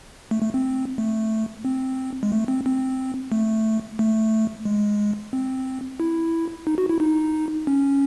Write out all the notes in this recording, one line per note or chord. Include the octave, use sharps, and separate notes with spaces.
A3
A3
C4
A3
C4
G#3
A3
C4
C4
A3
A3
G#3
C4
E4
D#4
F#4
E4
D#4
C#4